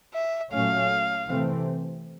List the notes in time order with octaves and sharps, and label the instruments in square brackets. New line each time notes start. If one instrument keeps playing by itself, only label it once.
[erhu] E5
[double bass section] A#2 F#3 A3 C#4 [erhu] F5
[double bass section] C3 E3 A3 C4